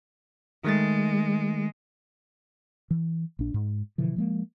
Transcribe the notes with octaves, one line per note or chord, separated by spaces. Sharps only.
D#3 G#3 A3 A6
E3
A#1 D4
G#2
B2 D3 E3 F3
F3 G#3 A#3